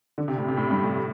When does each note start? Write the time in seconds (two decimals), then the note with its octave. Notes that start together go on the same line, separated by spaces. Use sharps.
0.18 D3
0.28 C3
0.38 A2
0.48 C3
0.57 A2
0.71 G2
0.84 A2